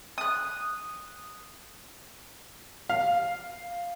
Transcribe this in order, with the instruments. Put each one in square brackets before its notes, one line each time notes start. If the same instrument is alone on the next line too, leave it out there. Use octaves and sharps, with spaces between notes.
[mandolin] D#6 F#6
[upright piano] F5